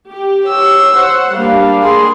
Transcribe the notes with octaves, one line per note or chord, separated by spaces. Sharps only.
G4
C#5 E6
C5 F#5
G3 A#3 D4 F5
G#4 C6